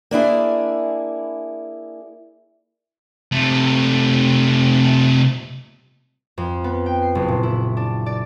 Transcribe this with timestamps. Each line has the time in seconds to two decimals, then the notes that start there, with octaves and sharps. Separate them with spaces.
0.11 A#3 D4 E4 G#4
3.32 C3 A3
6.38 F2
6.64 B3
6.86 G5
7.02 C7
7.15 F#1
7.28 A#2
7.43 E4
7.77 D4
8.06 D5